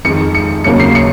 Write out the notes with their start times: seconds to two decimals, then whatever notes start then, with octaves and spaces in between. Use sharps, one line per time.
0.04 F2 D#3 G#3 C#7
0.35 C#7
0.64 D#2 C#3 F#3 A#3 C#7
0.80 C7
0.95 C#7